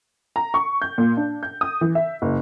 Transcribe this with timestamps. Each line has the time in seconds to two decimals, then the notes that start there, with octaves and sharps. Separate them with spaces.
0.36 A#5
0.54 C#6
0.82 G6
0.98 A#2
1.17 D4
1.43 G6
1.61 D#6
1.81 E3
1.95 E5
2.22 F#1